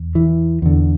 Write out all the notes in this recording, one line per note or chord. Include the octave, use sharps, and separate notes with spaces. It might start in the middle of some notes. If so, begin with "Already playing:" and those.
Already playing: E2
E3
E2 D3